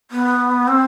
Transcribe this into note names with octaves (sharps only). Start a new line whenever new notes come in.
B3
C4